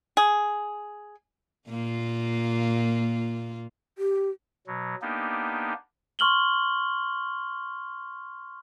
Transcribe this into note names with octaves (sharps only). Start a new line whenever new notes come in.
G#4
A#2 A#3 F4
G4
B2 F#3
A#3 B3 D4 D#4 G4
C6 C#6 F6 F#7 G7